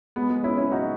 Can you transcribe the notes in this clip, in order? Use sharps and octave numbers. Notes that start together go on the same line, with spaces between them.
G#3 B3
G#3
C#4 E4
C#4 E4
D#4 F#4